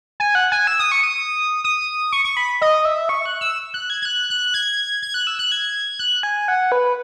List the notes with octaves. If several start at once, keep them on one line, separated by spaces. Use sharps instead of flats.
G#5
F#5
G#5
E6
D#6
C#6
D#6
D#6
C#6
C#6
B5
D#5
E5
C#6
F#6
E6
F#6
G#6
G#6
F#6
F#6
G#6
G#6
F#6
E6
F#6
G#6
F#6
G#5
F#5
B4